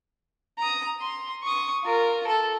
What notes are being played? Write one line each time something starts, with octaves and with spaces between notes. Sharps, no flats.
A#5 D#6
C6
C#6 D#6
F4 A#4
A4